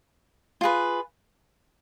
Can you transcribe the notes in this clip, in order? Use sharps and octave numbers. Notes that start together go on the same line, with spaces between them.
F4 G#4 B4